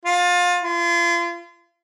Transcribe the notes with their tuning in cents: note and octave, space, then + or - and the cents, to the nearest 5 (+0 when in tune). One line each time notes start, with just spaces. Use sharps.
F4 +25
F4 -35